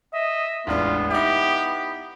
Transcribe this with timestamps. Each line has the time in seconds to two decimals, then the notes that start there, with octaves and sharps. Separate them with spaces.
0.14 D#5 E5
0.67 E1 A1 B3 D4 F4
1.10 D#4 E4 G4